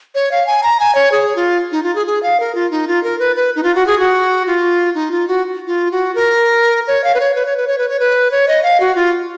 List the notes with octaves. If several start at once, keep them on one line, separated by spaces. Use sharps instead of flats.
C#5
F5
G#5
A#5
G#5
C#5
G#4
F4
D#4
F4
G#4
G#4
F5
A#4
F4
D#4
F4
A#4
B4
B4
D#4
F4
F#4
G#4
F#4
F4
D#4
F4
F#4
F4
F#4
A#4
C#5
F5
B4
C#5
B4
C#5
B4
C#5
B4
C#5
B4
C#5
D#5
F5
F#4
F4